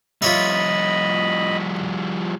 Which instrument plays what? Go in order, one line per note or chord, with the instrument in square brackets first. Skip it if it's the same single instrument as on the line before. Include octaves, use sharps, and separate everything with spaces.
[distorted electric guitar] F3 G3 [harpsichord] F4 C#5 E5 [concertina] D#5 B5